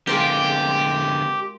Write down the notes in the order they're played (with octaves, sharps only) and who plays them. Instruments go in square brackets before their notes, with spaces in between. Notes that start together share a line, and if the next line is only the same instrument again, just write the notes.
[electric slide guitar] D3 B3 C4 [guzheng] G#3 F4 A#4 [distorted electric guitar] G4